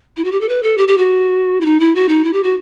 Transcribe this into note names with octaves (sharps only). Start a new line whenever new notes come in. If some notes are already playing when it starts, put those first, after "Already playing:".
E4
F#4
G4
A4
B4
A4
G4
G4
F#4
E4
D#4
E4
F#4
D#4
E4
G4
F#4